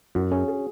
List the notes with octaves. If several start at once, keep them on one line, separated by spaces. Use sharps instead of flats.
F#2 F#4
C#4 G#4
G#4